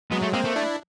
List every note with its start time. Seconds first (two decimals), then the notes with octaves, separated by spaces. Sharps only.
0.12 F#3 G#3 B3
0.23 A3
0.33 G#3 A#3 C4
0.45 A3
0.56 D4 E4